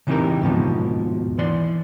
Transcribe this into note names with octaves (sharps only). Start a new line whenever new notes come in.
C#3 E3 C4 D#4 G4 A#4
D#2 G#2 B2 F3
E3 D5 C6